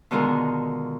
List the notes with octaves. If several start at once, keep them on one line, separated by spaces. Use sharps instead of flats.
B2 D3 D#3 G#3 F4 A#4